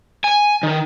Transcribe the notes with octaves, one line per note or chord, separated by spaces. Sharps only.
G#5
D#3